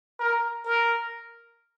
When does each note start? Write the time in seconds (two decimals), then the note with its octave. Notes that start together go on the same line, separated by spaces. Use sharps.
0.20 A#4
0.65 A#4